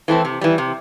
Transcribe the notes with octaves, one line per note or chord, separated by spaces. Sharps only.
E3 A3 C4
C3
E3 G3
C3